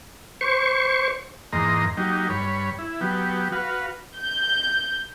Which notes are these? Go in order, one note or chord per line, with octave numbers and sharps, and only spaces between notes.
C5 C#6
E2 G#2 A#3 D#5 A#5 C6
F#3 A#3 D#4 G4
G2 C#5 B5
E4
F#3 B3 G4
F#4 B4 F5
G6